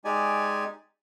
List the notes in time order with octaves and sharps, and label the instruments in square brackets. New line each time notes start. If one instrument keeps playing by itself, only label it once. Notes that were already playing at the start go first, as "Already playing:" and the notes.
[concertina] G#3 D#4 G4 D5 G#5